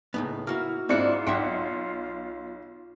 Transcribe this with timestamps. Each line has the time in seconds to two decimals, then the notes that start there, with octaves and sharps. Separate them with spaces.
0.14 C#2 A2 B3 D#4
0.47 A#3 E4 F#4 F6
0.89 G#2 C4 D4 E4 F4 D5 C#7
1.27 B1 E5 F#5 G5 C6 C#7